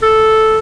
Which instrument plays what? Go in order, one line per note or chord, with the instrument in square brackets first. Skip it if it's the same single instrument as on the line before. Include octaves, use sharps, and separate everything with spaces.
[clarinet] A4